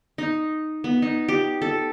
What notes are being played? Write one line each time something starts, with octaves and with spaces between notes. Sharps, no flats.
D#4
B3
D#4
G4
A4